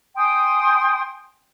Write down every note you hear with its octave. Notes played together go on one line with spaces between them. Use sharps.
G5 G#5 C6 D#6